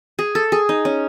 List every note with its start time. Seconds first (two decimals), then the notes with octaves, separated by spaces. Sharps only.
0.19 G#4
0.35 A4
0.52 G#4
0.69 D#4
0.85 C#4